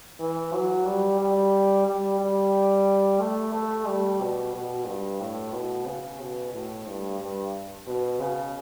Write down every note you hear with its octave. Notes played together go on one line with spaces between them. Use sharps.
E3
F#3
G3
G3
G3
G3
A3
A3
G3
B2
B2
G2
A2
B2
C#3
B2
A2
G2
G2
B2
C#3